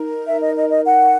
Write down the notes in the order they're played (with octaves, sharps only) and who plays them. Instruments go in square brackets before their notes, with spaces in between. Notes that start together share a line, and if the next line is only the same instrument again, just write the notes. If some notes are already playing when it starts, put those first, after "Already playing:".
Already playing: [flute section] D#4 A#4
E5
D#5
D#5
D#5
F#5